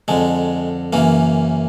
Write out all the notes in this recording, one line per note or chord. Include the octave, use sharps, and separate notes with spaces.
F2 D3 G#3
F#2 C#3 E3 A#3